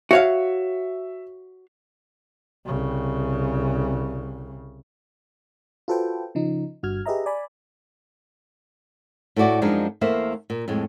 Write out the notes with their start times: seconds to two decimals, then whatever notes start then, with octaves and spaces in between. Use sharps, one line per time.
0.11 F#4 C#5 E5 F5
2.66 C2 C#3
5.88 F4 F#4 A4 B4 C5 G5
6.35 C#3 F3 D#4
6.83 G1 G2 F#4 F6 G#6
7.06 G4 G#4 B4 D#5 E5 A#5
7.26 D5 G#5 B5
9.36 A2 A3 E4 F#4 D5
9.61 F#2 F3 G#3 D4 D#4
10.01 E2 A3 A#3 C5 E5
10.50 A#2
10.68 F2 A2 G#3